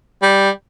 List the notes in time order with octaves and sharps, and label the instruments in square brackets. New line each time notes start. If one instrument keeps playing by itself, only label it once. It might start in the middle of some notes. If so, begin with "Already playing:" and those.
[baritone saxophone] G3